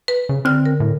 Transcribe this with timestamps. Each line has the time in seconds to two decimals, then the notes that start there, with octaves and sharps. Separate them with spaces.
0.08 B4
0.29 C#3
0.45 D3 C4 F6
0.66 A#4
0.80 A2